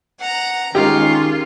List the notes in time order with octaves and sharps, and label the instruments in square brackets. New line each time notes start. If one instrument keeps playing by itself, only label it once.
[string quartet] F#5 A#5
[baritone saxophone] D#3 [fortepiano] G#3 G4 [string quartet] C#4 [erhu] F4